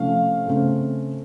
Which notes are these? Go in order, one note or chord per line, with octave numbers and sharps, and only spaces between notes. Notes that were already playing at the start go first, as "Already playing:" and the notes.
Already playing: C3 F3 A3 C#4 F5
C#3 A3 C4